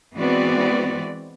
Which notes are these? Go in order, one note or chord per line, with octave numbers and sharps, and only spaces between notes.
E3 G#3 B3 C4 F#4 D5